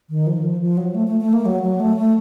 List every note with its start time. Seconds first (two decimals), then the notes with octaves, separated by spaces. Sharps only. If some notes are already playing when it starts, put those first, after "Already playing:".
0.10 D#3
0.27 F3
0.37 D#3
0.43 F3
0.61 F3
0.77 F#3
0.95 A3
1.07 A3
1.21 A3
1.33 A#3
1.46 F#3
1.63 F#3
1.80 A3
1.97 A3